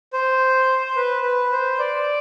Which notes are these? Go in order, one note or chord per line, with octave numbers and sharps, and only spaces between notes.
C5
B4
B4
C5
D5